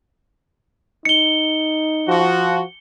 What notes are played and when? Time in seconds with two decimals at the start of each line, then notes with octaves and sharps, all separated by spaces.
1.05 D#4 C#7 G7
2.08 F3 F#4